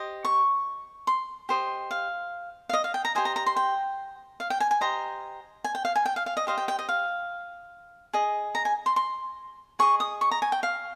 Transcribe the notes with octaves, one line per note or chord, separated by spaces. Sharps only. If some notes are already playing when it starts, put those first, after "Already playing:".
Already playing: G4 C5 D#5
C#6
C6
G4 C5 D#5
F5
F5
D#5
F5
G5
A#5
G4 C5 D#5 G#5
A#5
A#5
C6
G5
F5
G5
G#5
G#5
G4 C5 D#5 A#5
G#5
G5
F5
G#5
G5
F5
F5
D#5
G4 C5 D#5 F5
G5
G5
D#5
F5
G#4 D#5
A#5
G#5
C6
C6
G#4 D#5 C#6
D#6
C#6
A#5
G#5
G5
F5